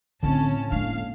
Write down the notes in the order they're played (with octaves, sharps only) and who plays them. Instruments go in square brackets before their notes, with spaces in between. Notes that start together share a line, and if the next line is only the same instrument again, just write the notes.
[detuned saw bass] A2 [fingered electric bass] D3 [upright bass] A3 C4 [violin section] C#4 A5
[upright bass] G#3 A#3 [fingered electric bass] D4 [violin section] F5